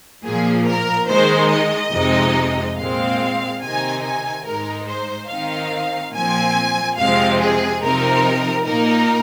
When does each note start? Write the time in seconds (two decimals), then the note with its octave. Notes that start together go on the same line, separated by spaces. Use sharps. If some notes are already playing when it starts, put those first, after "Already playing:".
0.24 A#2 F3 A#3 G#4
0.66 A#4
1.08 D#3 G#3 D#4 C5
1.51 D#5
1.93 F2 C3 G#3 D#4
2.77 A#2 G#3 C4 F5
3.61 C3 D#3 C4 D#4 G#5
4.03 G#5
4.45 G#2 G#3 D#4 A#4
4.87 C5
5.29 D#3 C4 D#4 F5
6.13 A#2 F3 C4 G#5
6.97 F2 C3 F3 G#3 C4 F5
7.40 G#4
7.81 C3 F3 C4 D#4 A#4
8.65 A#2 A#3 D#4 A#4